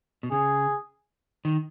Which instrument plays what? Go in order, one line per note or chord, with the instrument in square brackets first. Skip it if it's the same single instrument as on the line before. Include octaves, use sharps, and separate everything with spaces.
[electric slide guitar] B2
[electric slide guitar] C#3 [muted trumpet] G#4
[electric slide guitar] D#3